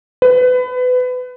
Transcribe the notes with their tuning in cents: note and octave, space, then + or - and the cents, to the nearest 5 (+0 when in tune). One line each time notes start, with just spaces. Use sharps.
B4 +25